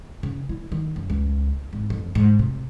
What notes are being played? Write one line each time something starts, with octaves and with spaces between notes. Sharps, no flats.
C#3
E4
D#3
F#2
C#2
G#1
F2
G#2
C3